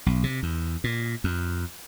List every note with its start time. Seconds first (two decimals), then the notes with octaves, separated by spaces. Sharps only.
0.06 B1
0.24 C3
0.43 E2
0.84 A#2
1.24 F2